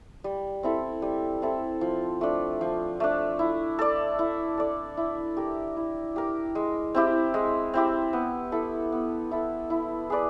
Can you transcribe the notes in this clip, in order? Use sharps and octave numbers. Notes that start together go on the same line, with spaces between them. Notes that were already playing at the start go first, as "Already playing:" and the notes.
G3
C4 E4 A4
G3
C4 E4 A4
F3
A3 D4
F3
A3 D4
E4
A4 D5
E4
A4 D5
E4
G4 A#4
E4
G4 A#4
G#3
C4 E4 G4
G#3
C4 E4 G4
B3
E4 A4
B3
E4 A4
E4
G#4 B4 D5